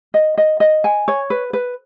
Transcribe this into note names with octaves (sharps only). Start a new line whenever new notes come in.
D#5
D#5
D#5
G#5
C#5
B4
B4